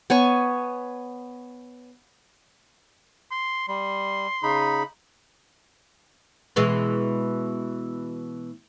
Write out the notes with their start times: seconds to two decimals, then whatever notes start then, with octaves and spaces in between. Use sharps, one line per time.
0.10 B3 C#5 G#5 C#6
3.31 C6
3.68 G3 C6
4.43 C#3 D#4 B5
6.56 B2 E3 G#3